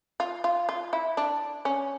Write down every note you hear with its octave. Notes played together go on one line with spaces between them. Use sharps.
F4
F4
F4
E4
D4
C#4